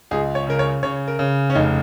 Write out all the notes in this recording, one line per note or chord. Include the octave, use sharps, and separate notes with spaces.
C#2 G#4
C#5
C#3 A#4
C#5
C#3 C#5
A#4
C#3
C#4
F1 D#4